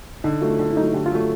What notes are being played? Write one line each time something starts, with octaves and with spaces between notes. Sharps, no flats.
D3 D#4
F#3 A3 F4
D3
E4
F#3 A3 D#4
D3 G4
F4
F#3 A3